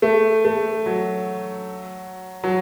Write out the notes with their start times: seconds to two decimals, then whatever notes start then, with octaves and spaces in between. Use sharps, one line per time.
0.02 A3
0.45 A3
0.86 F#3
2.44 F#3